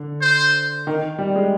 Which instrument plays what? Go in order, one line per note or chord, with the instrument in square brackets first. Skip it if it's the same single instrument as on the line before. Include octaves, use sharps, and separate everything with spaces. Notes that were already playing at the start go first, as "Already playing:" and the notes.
Already playing: [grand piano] D3
[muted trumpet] C5
[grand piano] D#3
G3
G#3